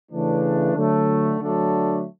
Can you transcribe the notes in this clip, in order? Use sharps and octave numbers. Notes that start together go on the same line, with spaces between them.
C#3 E3 A3 D4
D3 F#3 A3
D3 F#3 A3 D4 A4